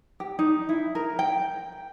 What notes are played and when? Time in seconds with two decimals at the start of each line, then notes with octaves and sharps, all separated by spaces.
0.20 G4
0.39 D#4
0.69 E4
0.95 A#4
1.19 G5